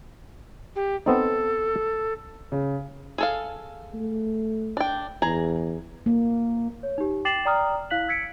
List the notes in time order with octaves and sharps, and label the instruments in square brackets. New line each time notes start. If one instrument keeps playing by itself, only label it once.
[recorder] G4
[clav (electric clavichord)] B3 C4 D#4 [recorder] A4
[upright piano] C#3
[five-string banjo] G#4 A4 F5
[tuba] A3
[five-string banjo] D4 G5
[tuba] E2 [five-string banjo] G#4 A#5
[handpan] A#3
[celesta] C#5
D#4 G4
G5 D6 A6 C7 E7 F#7
D5 G5 A#5 D#6 F6
E4 F5 F#6 B6 F#7
E6 G#6 B6 C#7 D7